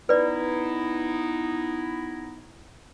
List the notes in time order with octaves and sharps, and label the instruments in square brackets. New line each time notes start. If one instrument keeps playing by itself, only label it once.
[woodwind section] B3 D#4 E4 [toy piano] B4 D5